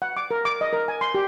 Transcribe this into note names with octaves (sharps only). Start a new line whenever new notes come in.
F#5
D6
A#4
D6
D#5
A#4
G#5
C6
G4